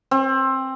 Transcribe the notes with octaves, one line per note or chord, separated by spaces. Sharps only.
C4